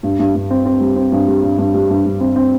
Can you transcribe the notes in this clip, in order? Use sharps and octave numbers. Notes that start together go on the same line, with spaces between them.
G2
G2
G2
C4
C4
G3
C4
G2
G3
G2
G2
G3
G2
G2
C4
C4